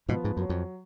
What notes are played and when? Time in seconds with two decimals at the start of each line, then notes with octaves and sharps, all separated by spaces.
0.09 G#2 B2 F3 B3
0.24 G#2
0.37 F#2 F#3
0.49 F2